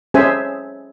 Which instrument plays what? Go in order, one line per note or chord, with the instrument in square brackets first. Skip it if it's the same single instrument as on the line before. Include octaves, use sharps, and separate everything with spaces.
[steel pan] C#4 G#4 C5 E5 G#5